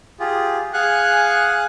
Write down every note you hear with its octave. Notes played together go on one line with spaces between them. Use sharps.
F4 G4 G#4
G#4 F5 F#5 G#5 F#6